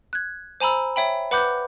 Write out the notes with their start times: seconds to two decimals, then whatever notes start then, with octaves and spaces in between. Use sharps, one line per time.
0.13 F#6 G#6
0.60 C5 G#5 A#5 B5 E6
0.96 C#5 E5 G5 B5
1.31 B4 F#5 B5 D6 F#6 G6